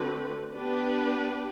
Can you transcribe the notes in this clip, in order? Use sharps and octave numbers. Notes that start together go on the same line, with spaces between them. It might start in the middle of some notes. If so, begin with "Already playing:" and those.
Already playing: D3 A3 C4 F#4 B4
B3 D4 G4 B4